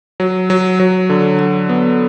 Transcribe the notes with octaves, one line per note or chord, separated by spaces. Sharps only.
F#3
F#3
F#3
D3
F#3
B3